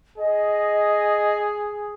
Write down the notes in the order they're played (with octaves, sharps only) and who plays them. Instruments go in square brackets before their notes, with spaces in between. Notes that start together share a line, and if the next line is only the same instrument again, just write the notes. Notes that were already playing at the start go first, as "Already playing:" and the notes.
[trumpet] G#4 [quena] D#5